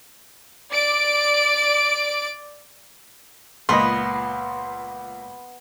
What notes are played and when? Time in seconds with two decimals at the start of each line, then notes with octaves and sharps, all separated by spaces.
0.71 D5 D7
3.69 C#2 A#2 B3 D#5 B5 C6